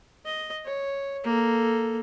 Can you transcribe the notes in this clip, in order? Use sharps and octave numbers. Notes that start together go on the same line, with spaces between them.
D#5
C#5
A#3 A4